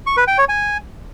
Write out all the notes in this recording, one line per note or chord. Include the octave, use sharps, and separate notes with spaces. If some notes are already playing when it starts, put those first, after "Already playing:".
C#6
B4
G5
C#5
G#5